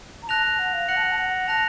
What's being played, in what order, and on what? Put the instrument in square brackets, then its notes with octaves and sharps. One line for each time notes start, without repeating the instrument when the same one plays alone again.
[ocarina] A#5
[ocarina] A5 [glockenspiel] F#6 A#6 F7
[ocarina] A5
F#5
F5
[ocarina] F#5 [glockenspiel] F#6 A#6 C#7 F#7
[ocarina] A5
F#5
A5
F#5
[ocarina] A5 [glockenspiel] F#6 A#6 F7